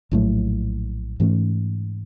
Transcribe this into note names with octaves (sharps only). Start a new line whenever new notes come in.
A#1 A2 F#3 A3
G#2 E3 A3 C#4